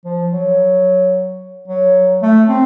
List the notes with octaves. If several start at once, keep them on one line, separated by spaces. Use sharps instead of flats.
F3
F#3
F#3
A3
C4